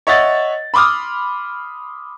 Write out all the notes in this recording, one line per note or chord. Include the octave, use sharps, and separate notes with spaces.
C#5 D#5 E5 F#5 A6
B5 C6 D6 D#6 F6